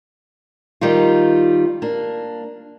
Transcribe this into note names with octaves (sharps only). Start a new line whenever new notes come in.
D#3 G3 D#4 F4
A#3 D4